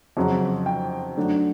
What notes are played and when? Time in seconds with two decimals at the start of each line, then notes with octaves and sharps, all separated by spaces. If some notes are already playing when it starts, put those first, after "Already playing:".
0.17 F2 C#3 F#3
0.66 G5
1.17 D3 F#3 A3 D4